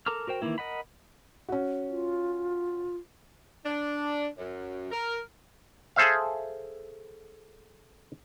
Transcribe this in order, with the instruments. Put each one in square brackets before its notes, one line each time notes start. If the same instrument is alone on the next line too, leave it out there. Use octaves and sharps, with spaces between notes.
[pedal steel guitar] A4 A#4 A#5 D6 F6
F#4 A#4 C5 G5
D#3 E3 A#3 E4
A#4 D#5 F#5 B5
[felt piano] C#4 F#4
[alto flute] F4
[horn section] D4
F#2
A#4
[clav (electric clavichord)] G#4 A4 C5 E5 F5